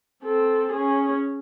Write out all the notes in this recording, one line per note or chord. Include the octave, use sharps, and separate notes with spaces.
C4 A4
C#4 G#4